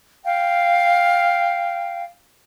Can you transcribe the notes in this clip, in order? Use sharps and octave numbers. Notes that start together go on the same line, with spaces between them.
F5 G5